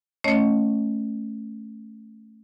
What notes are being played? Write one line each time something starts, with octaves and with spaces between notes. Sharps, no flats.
A3 C#4 C#5 D#5